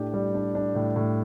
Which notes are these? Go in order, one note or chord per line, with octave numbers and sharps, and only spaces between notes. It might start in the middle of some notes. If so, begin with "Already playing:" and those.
Already playing: A2 D4 G4
G3
D4
D4
A2
A2